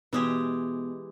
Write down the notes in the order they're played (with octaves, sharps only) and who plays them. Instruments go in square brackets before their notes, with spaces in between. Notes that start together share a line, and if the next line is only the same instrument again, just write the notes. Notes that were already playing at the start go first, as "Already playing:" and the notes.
[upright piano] B2 [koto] E3 G#3 G4